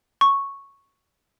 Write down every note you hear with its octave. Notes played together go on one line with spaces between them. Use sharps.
C#6